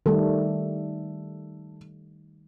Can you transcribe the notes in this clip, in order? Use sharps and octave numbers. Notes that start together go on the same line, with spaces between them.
D#3 G3 A3 A4